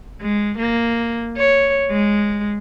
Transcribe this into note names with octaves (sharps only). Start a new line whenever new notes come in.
G#3
A#3
C#5
G#3